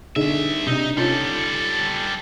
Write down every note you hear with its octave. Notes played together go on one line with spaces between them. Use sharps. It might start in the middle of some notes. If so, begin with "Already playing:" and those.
C2 D3 D#4 G#4 E5
C3 D4 D#4
G3 C#4 D#4 F4 A4